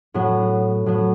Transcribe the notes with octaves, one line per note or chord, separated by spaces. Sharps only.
A2 F#3 B3
A2 F#3 B3